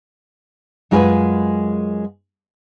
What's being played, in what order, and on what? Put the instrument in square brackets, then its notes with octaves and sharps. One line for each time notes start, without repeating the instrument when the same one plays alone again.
[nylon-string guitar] F#2 G#3 F4 B4 G#5